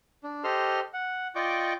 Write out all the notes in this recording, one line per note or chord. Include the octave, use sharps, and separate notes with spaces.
D4
G4 A4 C5 D#5 C6 F6
F#5
F4 D5 D#5 G5 C#6 D6